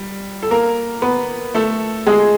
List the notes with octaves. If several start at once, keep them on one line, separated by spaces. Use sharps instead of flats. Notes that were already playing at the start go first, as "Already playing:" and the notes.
Already playing: G3
A4
A#3 A#4
B3 B4
A3 A4
G#3 G#4